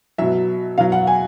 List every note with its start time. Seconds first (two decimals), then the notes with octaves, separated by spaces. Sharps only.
0.18 B2 F#3 E5
0.78 B2 F#3 F5
0.92 F#5
1.07 G#5